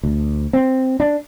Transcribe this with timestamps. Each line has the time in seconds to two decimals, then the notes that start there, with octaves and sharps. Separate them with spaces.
0.03 D2
0.53 C4
1.00 D4